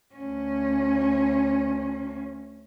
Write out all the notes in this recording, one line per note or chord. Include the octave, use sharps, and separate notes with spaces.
D2 C#4